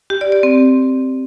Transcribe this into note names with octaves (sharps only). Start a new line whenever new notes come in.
G4
D5
D5
C4